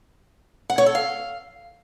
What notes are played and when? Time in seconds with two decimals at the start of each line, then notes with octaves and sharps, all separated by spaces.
0.70 F#5
0.78 C#5
0.86 A4
0.95 F5